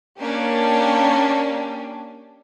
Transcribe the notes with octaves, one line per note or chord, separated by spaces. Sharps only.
A#3 C#4 D4 G4